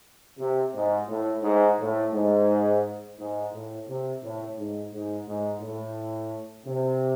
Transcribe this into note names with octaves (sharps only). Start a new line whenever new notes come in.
C3
G#2
A2
G#2
A2
G#2
G#2
A2
C3
A2
G#2
G#2
G#2
A2
C3